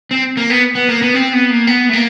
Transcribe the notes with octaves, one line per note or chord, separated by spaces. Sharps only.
C4
A#3
B3
B3
A#3
B3
C4
B3
A#3
B3
A3
A#3